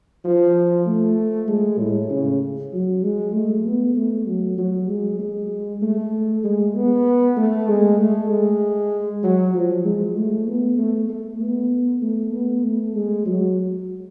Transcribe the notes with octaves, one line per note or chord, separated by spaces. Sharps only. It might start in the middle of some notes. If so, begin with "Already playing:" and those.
F3
A3
G#3
A2
C#3
F#3
G#3
A3
B3
A3
F#3
F#3
G#3
G#3
A3
G#3
B3
A3
G#3
A3
G#3
F#3
F3
G#3
A3
B3
A3
A3
B3
A3
B3
A3
G#3
F#3